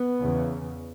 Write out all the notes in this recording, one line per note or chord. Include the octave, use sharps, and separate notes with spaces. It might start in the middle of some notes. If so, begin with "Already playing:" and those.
Already playing: B3
E2 C#3